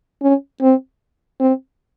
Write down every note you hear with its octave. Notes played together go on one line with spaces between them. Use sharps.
C#4
C4
C4